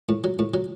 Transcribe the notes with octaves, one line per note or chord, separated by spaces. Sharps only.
A2
F#3
A2
F#3